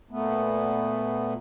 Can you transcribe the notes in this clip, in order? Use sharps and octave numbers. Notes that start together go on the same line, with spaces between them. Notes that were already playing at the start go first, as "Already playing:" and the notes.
A#2 A3 B3